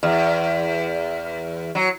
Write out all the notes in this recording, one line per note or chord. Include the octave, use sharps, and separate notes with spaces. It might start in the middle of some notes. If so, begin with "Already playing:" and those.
E2
F#3